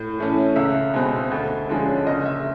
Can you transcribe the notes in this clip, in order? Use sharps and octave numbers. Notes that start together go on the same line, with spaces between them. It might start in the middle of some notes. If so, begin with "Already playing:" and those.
Already playing: A2
E3 A3 C#4
C#2 E5
B2 G#3 C4
D2
D3 F3 G#3 C#4
F#1 D#5
E5